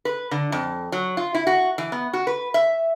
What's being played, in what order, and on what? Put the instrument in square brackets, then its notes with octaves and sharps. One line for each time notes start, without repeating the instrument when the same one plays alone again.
[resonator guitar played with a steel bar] B4
D3
F2
F#3
F4
E4
F#4
E3
B3
F#4
B4
E5